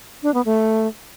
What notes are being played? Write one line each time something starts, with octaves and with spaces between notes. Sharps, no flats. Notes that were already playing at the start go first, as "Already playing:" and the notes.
D4
B3
A3